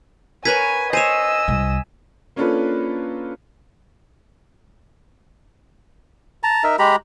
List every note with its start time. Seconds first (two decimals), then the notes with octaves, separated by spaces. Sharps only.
0.45 A#4 B4 C#5 G#5 G#6 B6 D#7
0.93 C5 C#5 D#5 G#5 E6 D#7 E7
1.48 C2
2.36 A#3 C#4 D4 F4 A4 B4
6.43 A5 A#5
6.64 D#4 A#4 E5
6.79 G#3 G4 A#5 B5